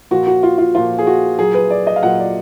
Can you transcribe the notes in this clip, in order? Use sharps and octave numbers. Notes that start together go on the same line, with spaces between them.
A#2 F3 F#4
F#4
F4
F4
A#2 F3 F4
G#4
F#4
A#2 F#3 G#4
B4
D5
D#5
F5
A#2 F#3 F#5
D5